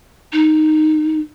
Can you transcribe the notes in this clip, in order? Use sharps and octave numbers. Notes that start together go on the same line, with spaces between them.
D#4